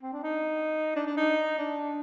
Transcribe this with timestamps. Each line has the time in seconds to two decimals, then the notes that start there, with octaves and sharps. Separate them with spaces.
0.02 C4
0.13 D4
0.23 D#4
0.96 D4
1.07 D4
1.17 D#4
1.58 D4